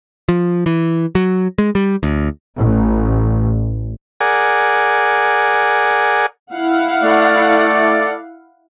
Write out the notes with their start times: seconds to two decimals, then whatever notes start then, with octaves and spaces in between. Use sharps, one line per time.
0.29 F3
0.66 E3
1.15 F#3
1.58 G#3
1.75 G3
2.03 D2
2.57 A1
4.20 G#4 A#4 D5 F#5 G#5
6.53 E4 F5 F#5
7.03 A3 A4 D5